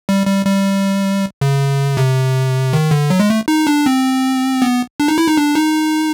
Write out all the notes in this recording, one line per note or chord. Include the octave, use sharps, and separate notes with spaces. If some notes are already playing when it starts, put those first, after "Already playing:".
G3
G3
G3
C#3
C3
D#3
D3
F#3
G#3
A3
D#4
D4
C4
B3
D4
D#4
E4
D#4
D4
D#4